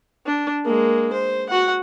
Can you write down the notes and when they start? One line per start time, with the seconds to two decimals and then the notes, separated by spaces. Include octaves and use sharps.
0.26 D4
0.65 G#3 A#3
1.13 C5
1.49 F#4 F#5